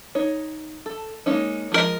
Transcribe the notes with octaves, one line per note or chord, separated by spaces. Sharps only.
D#4 C#5
A4
G#3 A#3 C#4 D#4
F3 G#3 C4 A#4 D#5